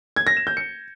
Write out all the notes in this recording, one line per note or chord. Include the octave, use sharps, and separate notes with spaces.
G#6
A#6
E7
G6
C#7